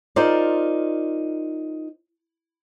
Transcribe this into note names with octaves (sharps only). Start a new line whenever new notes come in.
D#4 F4 G#4 A#4 C5 D5